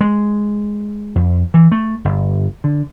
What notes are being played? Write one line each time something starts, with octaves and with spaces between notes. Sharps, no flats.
G#3
F2
E3
A3
G1
D3